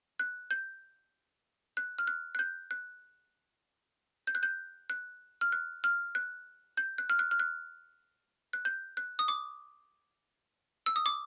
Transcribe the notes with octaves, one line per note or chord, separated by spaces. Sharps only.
F#6
G6
F#6
F6
F#6
F#6
G6
F#6
G6
F#6
G6
F#6
F6
F#6
F6
F#6
G6
F#6
F6
F#6
F6
F#6
F#6
G6
F#6
D#6
D6
E6
D#6
D6